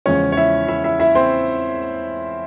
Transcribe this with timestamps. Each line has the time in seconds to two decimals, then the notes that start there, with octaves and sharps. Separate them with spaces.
0.06 E2 C#3 F3 G#3 C#4 C#5
0.32 C#5
0.37 E4 E5
0.68 E4 E5
0.84 E4 E5
1.00 E4 E5
1.15 C4 C5